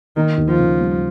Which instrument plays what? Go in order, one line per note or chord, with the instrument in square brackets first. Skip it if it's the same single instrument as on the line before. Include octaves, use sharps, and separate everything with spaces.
[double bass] D#3 [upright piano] A#3
[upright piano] D#2
[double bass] F3
[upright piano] C#3
G3